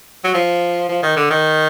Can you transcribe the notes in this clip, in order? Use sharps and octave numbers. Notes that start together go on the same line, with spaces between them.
F#3
F3
F3
D#3
D3
D#3